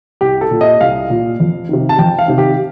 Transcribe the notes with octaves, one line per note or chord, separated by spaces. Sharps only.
C2 G4
A4
A#2
D#5
C2 F5
A#2
F2
C3 D#3
A5
F2 G5
F5
C3 D#3
G4